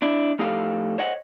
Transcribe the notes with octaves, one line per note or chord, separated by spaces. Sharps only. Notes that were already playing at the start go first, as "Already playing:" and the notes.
D4 E4
F2 A2 D#4 G4 A4 F5
C5 C#5 D#5 F#5